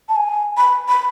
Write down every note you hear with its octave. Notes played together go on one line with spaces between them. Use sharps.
A5
G#5
B5
B5